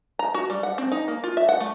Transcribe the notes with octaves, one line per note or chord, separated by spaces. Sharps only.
A#5
F#4
G3
F#5
C4
D#4
A#3
F4
E5
F#5
A3